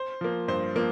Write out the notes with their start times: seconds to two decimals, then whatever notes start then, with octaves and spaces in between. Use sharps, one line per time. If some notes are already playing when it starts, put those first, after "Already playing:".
Already playing: C5
0.21 F3 A#3
0.48 G2 C5
0.76 F3 A#3